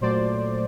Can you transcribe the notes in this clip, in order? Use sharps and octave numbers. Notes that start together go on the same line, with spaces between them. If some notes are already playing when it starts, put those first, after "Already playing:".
A#2 F#3 A3 C5 D5